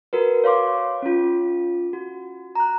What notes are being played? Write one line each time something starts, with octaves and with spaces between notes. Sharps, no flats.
F#4 A#4 B4
C#5 F5 C6 D6
C#4 F4
F#4
A#5 F#6